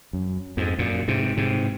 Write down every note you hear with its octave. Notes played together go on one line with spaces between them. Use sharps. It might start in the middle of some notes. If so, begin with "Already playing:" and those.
F#2
F2 G#2
F#2 A#2
G#2 C3
G#2 C3